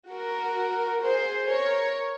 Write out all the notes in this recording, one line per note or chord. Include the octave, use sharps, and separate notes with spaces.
F#4 A#4
G#4 C5
A#4 C#5